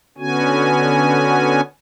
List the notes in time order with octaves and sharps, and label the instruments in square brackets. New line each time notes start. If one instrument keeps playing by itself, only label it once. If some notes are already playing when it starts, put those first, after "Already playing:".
[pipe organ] D3 B3 C#4 F#4 G#5